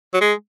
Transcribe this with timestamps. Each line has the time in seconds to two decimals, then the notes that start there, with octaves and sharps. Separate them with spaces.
0.14 F#3
0.21 G#3